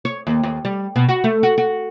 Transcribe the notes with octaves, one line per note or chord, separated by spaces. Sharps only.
C#5
D#2
D#2
G3
B2
F#4
A3
F#4
F#4